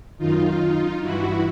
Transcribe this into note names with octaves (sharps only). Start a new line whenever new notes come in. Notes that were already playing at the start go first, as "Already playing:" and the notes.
F#2 D#3 D#4 F4
G2 E3 E4 F#4